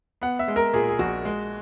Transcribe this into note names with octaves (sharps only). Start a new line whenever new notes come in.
B3 F#5
E5
G#3
A#4
A#2 G#4
G#4
A#1 F#4
G#3